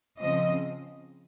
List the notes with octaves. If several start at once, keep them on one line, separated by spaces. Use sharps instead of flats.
C#3 F3 C4 D#5